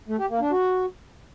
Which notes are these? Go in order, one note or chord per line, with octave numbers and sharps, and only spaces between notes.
A3
G4
A#3
D4
F#4